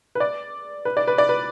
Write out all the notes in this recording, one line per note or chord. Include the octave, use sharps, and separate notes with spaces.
B4
D5
B4
D5
B4
D5
B4